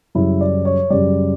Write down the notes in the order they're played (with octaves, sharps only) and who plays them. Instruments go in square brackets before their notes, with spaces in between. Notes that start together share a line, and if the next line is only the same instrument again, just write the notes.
[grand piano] F#2 C#3 G3 E4
D5
C#5
F#2 C#3 G3 D5